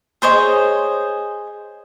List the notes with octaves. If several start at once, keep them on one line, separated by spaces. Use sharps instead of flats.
G#4 C5 C#5 D#5